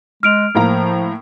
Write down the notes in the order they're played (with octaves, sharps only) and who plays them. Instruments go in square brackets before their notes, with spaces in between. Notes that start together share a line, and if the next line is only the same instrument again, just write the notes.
[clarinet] G#3 [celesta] F6 D7 F7
[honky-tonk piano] A2 A#3 A#5 [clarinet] F3